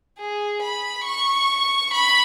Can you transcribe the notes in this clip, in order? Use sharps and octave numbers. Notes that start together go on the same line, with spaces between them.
G#4
B5
C#6
B5